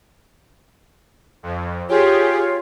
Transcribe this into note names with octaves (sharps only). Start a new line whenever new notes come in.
F2
F4 G4 G#4 C#5